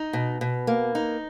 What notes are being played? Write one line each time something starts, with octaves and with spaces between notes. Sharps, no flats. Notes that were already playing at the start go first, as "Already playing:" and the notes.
Already playing: D#4
B2
B2
A#3
D#4